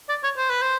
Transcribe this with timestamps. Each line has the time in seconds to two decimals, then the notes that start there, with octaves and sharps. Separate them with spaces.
0.09 D5
0.23 C#5
0.37 C5
0.50 B4
0.62 C5